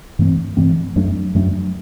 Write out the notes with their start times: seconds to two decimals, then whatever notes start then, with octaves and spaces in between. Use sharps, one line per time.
0.19 G2 E3 A3 C4
0.57 G2 E3 A3 C4
0.96 F#2 F#3 A3 D4
1.35 F#2 F#3 A3 D4